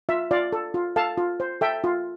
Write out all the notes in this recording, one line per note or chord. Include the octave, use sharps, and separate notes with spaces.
F4 E5
F4 D5 F5
A4
F4
A4 F5 A5
F4
C5
A4 E5 G5
F4